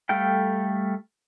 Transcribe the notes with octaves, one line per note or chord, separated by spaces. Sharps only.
G3 A3 A4 F5 G5